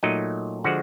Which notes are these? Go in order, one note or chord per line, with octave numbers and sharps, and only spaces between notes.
A#2 F#3 A3 D#4 D#5
D3 F3 G#3 F#4 F#5